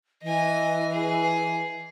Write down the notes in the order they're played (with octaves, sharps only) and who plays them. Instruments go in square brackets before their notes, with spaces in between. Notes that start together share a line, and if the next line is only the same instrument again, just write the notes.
[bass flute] E3 [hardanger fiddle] D#5 G#5
[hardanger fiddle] G#4